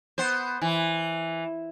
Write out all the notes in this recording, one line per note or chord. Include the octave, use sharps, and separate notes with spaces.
B3 C5
E3